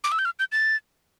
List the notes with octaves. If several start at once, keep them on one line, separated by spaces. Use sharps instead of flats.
D6
E6
G6
F6
G6
A6